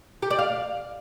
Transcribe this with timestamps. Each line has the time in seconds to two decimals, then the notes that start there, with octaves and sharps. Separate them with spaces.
0.22 G4
0.31 D5
0.39 F5